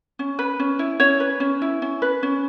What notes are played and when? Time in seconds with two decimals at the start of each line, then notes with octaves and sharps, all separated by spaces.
0.19 C#4
0.39 B4
0.60 C#4
0.79 E4
1.00 C#4 C#5
1.20 B4
1.40 C#4
1.62 E4
1.82 C#4
2.02 B4
2.23 C#4